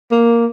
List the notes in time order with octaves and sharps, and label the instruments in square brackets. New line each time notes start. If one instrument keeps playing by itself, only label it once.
[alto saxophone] A#3